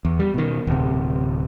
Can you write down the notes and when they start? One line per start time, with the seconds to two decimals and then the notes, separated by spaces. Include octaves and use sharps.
0.05 E2
0.19 G3
0.34 B2 D#3
0.67 D1 C3